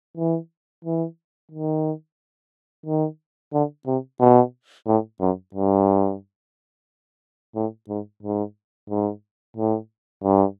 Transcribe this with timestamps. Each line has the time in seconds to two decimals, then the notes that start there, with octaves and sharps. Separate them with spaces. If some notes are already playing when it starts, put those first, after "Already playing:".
0.17 E3
0.85 E3
1.51 D#3
2.86 D#3
3.53 D3
3.87 C3
4.20 B2
4.87 A2
5.20 F#2
5.54 G2
7.56 A2
7.89 G#2
8.23 G#2
8.90 G#2
9.57 A2
10.24 G2